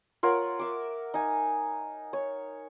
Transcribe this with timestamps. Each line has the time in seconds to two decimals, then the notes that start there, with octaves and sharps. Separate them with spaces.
0.23 F4 A#4 C#5 F#5
0.59 E5 D6
1.14 D#4 G#5
2.13 C#5